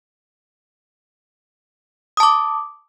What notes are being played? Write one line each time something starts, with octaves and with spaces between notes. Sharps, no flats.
A5 D6 D#6